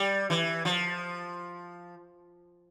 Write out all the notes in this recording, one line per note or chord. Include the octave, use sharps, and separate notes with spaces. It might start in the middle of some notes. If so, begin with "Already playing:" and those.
Already playing: G3
E3
F3